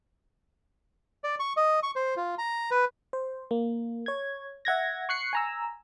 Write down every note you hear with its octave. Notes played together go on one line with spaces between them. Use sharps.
D5
C#6
D#5
C#6
C5
F4
A#5
B4
C5
A#3
C#5 G#6
E5 F#5 G#6 A#6
C#6 F#6 C7 C#7
G#5 A#5 E6